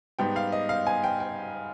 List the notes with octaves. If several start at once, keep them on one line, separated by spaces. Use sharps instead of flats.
G#2 G3 B3 G5
F5
D#5
F5
G#5
G5
G5